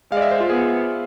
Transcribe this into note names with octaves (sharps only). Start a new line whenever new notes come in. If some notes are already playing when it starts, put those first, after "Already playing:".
G#3 D5 F5
E5
C5
F4
B3 G#4